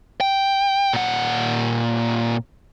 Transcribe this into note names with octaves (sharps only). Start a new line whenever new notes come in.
G5
A#2 F#5